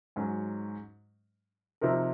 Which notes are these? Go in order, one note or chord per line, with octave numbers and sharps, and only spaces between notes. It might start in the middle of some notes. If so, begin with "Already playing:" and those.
G#2 F#3 C#4
C3 F3 C4 D#4 A#4